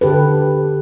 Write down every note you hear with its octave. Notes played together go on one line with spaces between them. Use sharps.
D3 G4 A4 B4